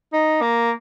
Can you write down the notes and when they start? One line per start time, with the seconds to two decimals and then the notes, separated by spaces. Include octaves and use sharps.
0.13 D#4
0.42 A#3